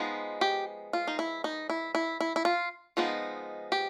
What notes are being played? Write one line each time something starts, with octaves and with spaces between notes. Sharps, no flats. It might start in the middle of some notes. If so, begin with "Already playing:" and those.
Already playing: F3 G#3 B3 D#4
G4
F4
D#4
E4
D#4
E4
E4
E4
E4
F4
F3 G#3 B3 D#4
G4